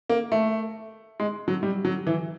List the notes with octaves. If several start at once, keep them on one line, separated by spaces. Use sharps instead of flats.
A#3
A3
G#3
F#3
G3
F#3
E3